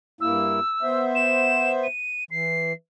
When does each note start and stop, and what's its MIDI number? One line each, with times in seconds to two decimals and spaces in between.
0.21 0.60 43
0.21 0.60 58
0.21 0.60 64
0.21 1.04 88
0.82 1.87 59
0.82 1.87 72
0.82 1.87 76
1.15 1.71 100
1.83 2.24 99
2.31 2.73 52
2.31 2.72 96